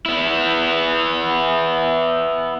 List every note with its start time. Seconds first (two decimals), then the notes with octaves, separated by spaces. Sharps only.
0.06 B3 E4